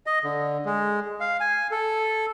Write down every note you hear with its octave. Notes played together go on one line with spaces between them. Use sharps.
D#5
D3
G#3
F5
G#5
A4